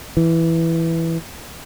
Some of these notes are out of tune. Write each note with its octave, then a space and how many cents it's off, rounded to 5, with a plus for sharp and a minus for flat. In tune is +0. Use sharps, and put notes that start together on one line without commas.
E3 +0